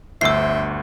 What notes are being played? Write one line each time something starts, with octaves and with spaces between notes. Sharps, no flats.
G1 D2 C5 E5 E6 C7